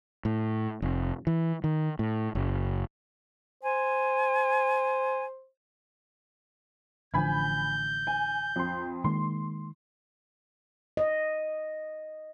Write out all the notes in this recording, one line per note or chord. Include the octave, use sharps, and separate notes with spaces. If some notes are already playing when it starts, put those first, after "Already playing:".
A2
F1
E3
D#3
A2
F#1
C5 G#5
A1 D3 F3 G#5 B5 G6 G#6
G#5
F2 C6
D#3 G#3 A#3 C6
D#5